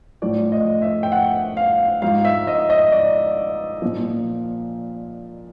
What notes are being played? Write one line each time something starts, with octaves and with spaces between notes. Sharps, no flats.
A2 F3 D5
D#5
E5
G5
F#5
F5
G#2 F3 F5
E5
D#5
D#5
D5
A#2 F3